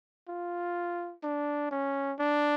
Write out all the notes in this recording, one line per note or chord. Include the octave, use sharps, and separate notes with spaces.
F4
D4
C#4
D4